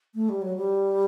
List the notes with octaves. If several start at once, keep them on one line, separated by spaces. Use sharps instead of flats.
A3
G3
F#3
G3